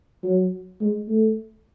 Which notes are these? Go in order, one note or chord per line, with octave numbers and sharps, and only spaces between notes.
F#3
G#3
A3